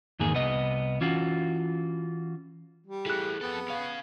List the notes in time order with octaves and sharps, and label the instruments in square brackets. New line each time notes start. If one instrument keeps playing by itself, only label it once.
[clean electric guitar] E2 G#2 D#3 A#3 G#4
C2 B3 D#5
E3 C#4 F4 F#4
[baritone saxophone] G3
[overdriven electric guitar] E3 A3 [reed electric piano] G#4 F#6
[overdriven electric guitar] F2 A4 [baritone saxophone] B3
[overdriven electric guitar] C#4 F5